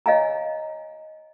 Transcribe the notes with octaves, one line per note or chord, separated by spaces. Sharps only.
C#5 D#5 F5 G#5 A#5